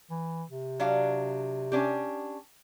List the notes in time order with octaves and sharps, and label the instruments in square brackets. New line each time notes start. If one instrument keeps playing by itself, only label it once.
[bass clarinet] E3
C3
[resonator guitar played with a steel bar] F#3 D4 F5
C#4 D4 G4